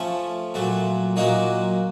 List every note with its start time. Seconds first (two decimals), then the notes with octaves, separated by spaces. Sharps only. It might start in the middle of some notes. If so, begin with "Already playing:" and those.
Already playing: F3 A3 C#4
0.54 A#2 F#3 A3
1.16 A#2 F#3 A#3 D#4 F#4